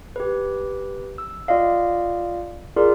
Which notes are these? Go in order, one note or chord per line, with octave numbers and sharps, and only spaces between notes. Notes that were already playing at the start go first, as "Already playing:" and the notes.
G4 B4
E6
F4 D5 D#5 F5
F4 G#4 A#4 D5